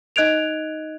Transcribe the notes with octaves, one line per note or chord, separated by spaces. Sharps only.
D#4 D#5 F#6 G#6 D7 F7